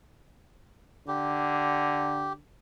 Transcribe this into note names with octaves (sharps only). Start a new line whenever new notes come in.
D3 G4